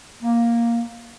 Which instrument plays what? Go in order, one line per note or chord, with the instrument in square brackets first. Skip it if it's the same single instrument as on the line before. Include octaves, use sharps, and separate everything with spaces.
[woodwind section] A#3